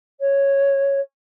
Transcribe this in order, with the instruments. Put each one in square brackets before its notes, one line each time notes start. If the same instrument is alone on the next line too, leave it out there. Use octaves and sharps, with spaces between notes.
[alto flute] C#5